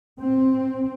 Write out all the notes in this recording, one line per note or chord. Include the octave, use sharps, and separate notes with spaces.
C4